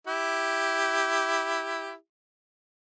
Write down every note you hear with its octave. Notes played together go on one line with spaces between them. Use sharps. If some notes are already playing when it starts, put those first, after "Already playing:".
E4 G4